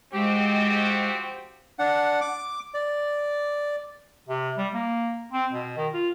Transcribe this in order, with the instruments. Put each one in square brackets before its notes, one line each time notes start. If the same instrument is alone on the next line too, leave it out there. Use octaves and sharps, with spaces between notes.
[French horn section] F3 C4 F#4 [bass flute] G#3 [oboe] G4
[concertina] D4 F#5
D6
D5
[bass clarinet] C3
G3
A#3
C4
B2
D#3
F4